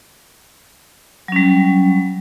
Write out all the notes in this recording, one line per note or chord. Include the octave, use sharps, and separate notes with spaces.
F#3 G3 C#4